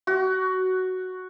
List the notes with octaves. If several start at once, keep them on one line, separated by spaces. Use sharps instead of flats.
F#4